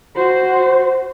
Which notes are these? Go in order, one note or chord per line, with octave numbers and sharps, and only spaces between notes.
F#4 C5